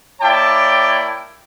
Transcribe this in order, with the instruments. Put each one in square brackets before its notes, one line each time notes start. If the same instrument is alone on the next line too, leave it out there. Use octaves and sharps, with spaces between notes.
[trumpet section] A#3 E4 C#5 D5 G5 A5